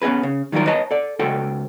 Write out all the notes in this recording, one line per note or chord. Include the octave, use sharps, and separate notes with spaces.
B3 C#4 E4 G#4 B4
C#3
D#3 F#3 G3 F4 A#4
B4 C#5 D#5 A5 A#5
A4 D5
C#2 F#4 A4 C5 G5